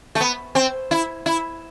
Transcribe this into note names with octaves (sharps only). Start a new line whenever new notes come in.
A3
B3
C4
E4
E4